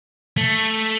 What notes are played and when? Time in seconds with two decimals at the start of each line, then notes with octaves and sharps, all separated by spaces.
0.37 A3